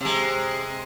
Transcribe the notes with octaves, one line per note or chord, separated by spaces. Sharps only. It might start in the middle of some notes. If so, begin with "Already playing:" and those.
C3 G#3